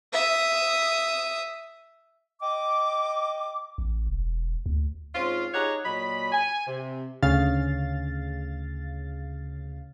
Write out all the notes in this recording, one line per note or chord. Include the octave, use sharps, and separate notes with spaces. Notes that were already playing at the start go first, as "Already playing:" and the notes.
E5 D#6
D#5 G5 D6
A1
E1
D2
G#2 C4 C#4 F4
D#4 G4 G#4 C#5 F#5 A#5
A#2 F#3 D#5 B5
G#5
C3
D2 C#3 F5 A6